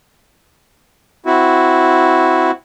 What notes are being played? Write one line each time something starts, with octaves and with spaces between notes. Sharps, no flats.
C4 E4 F#4